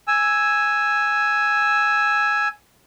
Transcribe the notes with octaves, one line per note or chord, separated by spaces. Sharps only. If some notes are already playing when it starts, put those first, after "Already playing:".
G#5 E6